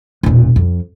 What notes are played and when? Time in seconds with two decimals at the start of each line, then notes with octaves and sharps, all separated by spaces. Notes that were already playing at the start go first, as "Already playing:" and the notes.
0.23 E1 A#2
0.56 F2